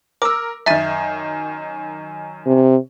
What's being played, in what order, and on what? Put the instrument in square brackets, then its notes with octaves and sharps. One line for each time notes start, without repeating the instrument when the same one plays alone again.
[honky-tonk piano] A#4 [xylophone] D6 E6
[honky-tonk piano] F#2 D#3 [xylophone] E5 A6 D#7
[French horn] C3